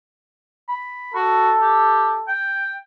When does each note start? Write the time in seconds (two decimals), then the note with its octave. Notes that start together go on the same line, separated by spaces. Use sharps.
0.68 B5
1.15 F#4 A4
1.62 G4
2.28 G5